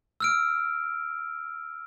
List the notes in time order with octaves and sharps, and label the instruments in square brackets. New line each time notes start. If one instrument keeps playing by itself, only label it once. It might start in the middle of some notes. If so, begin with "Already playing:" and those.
[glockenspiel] E6 F6 D7